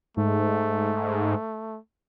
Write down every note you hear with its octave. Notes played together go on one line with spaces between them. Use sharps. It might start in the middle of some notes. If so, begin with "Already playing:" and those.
G#2 A3